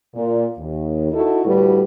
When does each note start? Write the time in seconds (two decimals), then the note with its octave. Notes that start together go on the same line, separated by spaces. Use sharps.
0.15 A#2
0.58 D#2
1.12 D#4 E4 F#4 A4
1.45 D2 A2 G3 F#4 B4